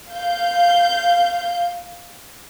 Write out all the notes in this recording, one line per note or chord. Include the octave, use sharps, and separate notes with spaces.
F5 G6